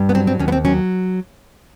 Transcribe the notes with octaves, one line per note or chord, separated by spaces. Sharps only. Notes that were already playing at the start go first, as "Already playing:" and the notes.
Already playing: G2 G3
B3
F#3 C4
C4
D#2 C#4
B3
C4
F#3 C#4